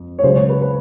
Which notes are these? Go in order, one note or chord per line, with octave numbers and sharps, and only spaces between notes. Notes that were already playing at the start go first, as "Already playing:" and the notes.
Already playing: F2
C#5
C#2 C#3 F#3 C5
C#5
B4
B4